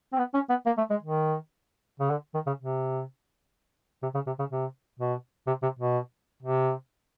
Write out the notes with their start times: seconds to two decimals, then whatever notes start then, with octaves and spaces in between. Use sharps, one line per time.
0.13 C4
0.18 B3
0.34 C#4
0.50 B3
0.66 A#3
0.78 A3
0.90 G#3
1.03 D#3
2.00 C#3
2.10 D3
2.34 D#3
2.46 C#3
2.59 C3
4.02 C3
4.14 C#3
4.26 C3
4.39 C#3
4.51 C3
4.99 B2
5.47 C3
5.63 C3
5.79 B2
6.43 C3